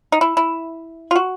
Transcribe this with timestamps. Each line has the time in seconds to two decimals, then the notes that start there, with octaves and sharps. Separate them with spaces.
0.12 D#4
0.21 E4
0.37 E4
1.11 F4
1.16 F#4